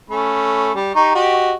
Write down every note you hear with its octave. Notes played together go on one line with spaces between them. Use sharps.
A3 C#4 B5
G3
D#4 G4 C#6
F#4 G4 D#5